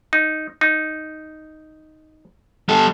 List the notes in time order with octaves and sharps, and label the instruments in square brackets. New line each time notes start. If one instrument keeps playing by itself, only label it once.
[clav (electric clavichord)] D#4
D#4
[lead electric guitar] G3 A4